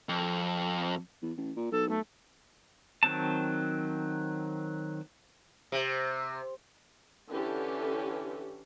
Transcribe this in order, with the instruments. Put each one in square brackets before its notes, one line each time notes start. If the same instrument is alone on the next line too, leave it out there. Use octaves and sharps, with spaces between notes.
[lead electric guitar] F2
[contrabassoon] E2
A1
A#2
[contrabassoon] B1 [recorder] A4
[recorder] A3
[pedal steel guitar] D#3 F#3 C4 A5
[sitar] C3
[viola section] D3 E3 C#4 G4 A4